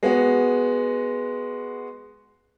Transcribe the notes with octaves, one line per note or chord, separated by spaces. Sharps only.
G#3 B3 F#4